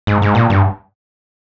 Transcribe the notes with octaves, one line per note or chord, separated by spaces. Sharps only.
G#2
G#2
A#2
G2